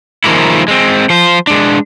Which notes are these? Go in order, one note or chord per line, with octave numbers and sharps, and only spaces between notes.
D#3 F3 G#3 A#3 E4
G#3 C4
F3 C5
G#3 D4